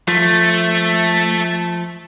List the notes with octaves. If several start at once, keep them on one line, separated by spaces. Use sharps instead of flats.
F3 A3